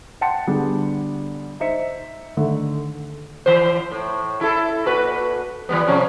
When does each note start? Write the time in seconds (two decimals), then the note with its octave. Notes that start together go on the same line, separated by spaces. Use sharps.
0.21 F#5 G5 A5 C6 C#7
0.47 D3 G3 B3 D4 G#4
1.60 D#4 C5 E5 C#7
2.37 D3 D#3 A3
3.46 E3 C5
3.91 A2
4.41 E4 A4
4.86 A#2 F#4 B4
5.69 E3 G3 B3
5.87 C3 F3 C#4